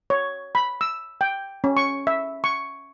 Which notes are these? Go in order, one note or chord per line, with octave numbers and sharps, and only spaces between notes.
C#5
B5
E6
G5
C#4
C#6
E5
C#6